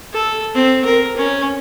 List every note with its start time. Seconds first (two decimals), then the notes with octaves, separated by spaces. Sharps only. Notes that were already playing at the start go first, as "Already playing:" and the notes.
0.13 A4
0.55 C4
0.85 A#4
1.17 C#4